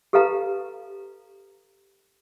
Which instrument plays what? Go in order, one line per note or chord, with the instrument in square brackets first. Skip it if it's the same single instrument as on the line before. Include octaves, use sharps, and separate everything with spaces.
[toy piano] G4 A4 B4 F5 A#5